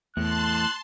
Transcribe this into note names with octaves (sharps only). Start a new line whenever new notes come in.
E2 A2 A5 C6 F#6